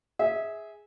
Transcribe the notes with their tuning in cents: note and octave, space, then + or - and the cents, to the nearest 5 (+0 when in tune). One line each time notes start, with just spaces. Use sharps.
G#4 +0 E5 -20